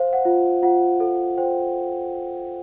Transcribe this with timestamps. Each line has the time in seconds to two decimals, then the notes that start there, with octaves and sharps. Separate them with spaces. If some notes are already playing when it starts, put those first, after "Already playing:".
Already playing: C5 F5
0.13 F#5
0.25 F4
0.63 F4 F#5
1.00 A4
1.38 C5 G5